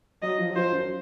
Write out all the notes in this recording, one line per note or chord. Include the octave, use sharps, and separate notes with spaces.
F#3 D#5
F3
F#3
F3 C5
F#2